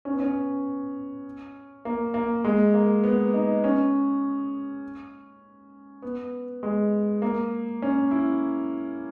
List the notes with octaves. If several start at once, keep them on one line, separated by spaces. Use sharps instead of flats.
C#4
B3
C#4
A#3
A#3
G#3
A#3
B3
D#4
C#4
B3
G#3
A#3
C#4
E4